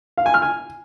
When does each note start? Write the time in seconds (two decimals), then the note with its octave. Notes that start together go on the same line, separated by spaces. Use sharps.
0.18 F5
0.26 G#5
0.34 F6
0.42 G#5